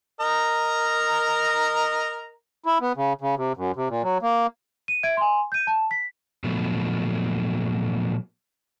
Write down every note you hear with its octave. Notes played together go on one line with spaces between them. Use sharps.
A#4 D#5 A#5
E4
B3
C#3
C#3
C3
F#2
C3
A#2
F#3
A#3
D#7
E5 G#6 D7
G#5 C6
G6 D#7
A5
B6
A#2 F3 F#3 A3 B3